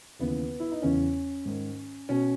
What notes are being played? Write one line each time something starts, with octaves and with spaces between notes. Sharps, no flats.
D#2 C#3 E3 B3
E4
D#4
E2 C#3 E3 C#4
G#2 D#3
B2 C#4